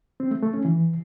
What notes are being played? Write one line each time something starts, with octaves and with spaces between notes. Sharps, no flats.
C4
A3
A3
C#4
E3